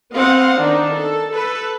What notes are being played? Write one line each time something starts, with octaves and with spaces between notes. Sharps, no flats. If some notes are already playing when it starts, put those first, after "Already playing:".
B3 C4 D#5 F5 F#5
D#3 D4 D#4
A4
A4 B4